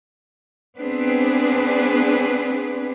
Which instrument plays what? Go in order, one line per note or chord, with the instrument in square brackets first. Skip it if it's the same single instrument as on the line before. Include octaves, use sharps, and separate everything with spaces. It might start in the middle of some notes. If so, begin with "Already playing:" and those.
[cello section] B3 C4 D4 G#4 B4